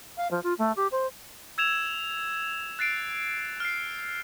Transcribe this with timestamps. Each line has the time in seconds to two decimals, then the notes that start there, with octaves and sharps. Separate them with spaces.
0.17 F5
0.31 F3
0.43 F4
0.58 A3
0.76 G4
0.91 C5
1.58 E6 G#6 E7 F7
2.79 F#6 A6 C7 D7
3.60 F6 C7